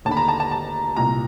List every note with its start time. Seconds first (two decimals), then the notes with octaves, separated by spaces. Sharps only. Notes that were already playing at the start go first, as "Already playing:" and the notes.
0.05 D#2 D3 A5
0.11 B5
0.17 A#5
0.28 A5
0.40 A5
0.51 A5
0.96 C2 A#2 A#5